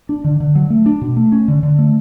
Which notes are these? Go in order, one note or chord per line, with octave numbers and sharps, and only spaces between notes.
D4
D3
D3
F#3
A3
D4
B2
A3
C#4
D3
D3
A3